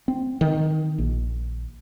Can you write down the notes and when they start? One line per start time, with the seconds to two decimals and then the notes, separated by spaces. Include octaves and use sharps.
0.08 C4
0.41 D#3
0.98 A#1